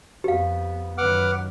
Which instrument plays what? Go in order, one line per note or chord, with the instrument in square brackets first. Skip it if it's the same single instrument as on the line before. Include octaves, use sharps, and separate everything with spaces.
[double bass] F2 B3 [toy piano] G4 F5
[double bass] F#2 D#3 [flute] B4 [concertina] F#5 D6 F6